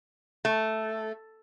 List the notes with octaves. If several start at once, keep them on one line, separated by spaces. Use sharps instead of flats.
A3